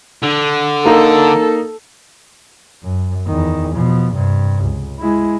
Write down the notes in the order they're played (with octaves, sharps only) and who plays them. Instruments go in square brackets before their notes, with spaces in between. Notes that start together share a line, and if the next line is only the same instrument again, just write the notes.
[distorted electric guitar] D3
[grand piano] A#3 D#4 [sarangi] A4
[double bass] F#2
E2 D#3
B2 F3
G2 C3
C#2
G#3 E4